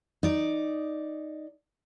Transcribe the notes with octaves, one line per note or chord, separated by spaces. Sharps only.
D#4 D5